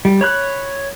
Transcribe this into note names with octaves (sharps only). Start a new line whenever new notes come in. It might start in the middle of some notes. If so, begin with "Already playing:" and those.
G3
C#5 B5 F#6